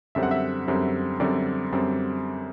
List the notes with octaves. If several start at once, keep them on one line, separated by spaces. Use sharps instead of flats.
F#2 D3 G3 C4 E5
F#5
E5
F#2 D3 G3 C4
F#2 D3 G3 C4 D5
F#2 D3 G3 C4